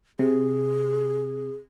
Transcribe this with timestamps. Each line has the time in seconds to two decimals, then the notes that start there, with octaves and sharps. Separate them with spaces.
0.19 C3 G#4